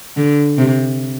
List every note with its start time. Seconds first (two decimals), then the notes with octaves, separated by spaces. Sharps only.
0.17 D3
0.58 C3